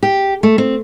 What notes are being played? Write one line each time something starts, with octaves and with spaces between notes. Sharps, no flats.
G4
A3
C4